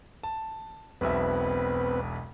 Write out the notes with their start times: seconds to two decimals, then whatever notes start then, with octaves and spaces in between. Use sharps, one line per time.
0.23 A5
1.01 E1 B1 B3 C4 B4 E5